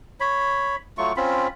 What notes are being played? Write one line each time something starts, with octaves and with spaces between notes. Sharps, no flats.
C#5 B5
F#3 A3 F4 C#6
C4 C#4 F4 B5